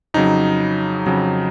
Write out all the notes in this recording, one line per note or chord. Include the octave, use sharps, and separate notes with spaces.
F2 C#3 F#3 D#4
F2 C#3 F#3